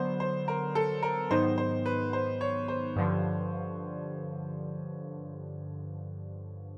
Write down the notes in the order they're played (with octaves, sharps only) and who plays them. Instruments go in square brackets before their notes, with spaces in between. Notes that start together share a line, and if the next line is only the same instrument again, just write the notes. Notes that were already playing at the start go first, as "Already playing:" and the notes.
Already playing: [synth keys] D3 F#3 B3 [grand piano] C5
[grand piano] C5
A#4
A4
A#4
[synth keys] G#2 D#3 F#3 B3 D#4 [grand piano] C5
[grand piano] C5
B4
C5
C#5
C5
[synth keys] G2 D3 F3